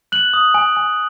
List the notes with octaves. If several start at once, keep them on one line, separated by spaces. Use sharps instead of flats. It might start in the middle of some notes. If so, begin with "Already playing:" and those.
F#6 F#7
D#6
G#5
G#5